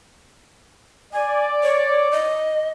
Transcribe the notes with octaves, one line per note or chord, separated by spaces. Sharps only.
D5 G#5
C#5
D#5